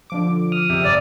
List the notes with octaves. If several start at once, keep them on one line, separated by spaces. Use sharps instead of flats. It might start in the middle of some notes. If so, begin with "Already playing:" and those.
D3 F3 D6
D#6 F6
C3
G1 D5